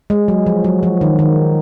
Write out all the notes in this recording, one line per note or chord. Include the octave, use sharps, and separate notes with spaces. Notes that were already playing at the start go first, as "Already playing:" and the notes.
G#3
F#3
F3
F#3
F3
D#3
D#3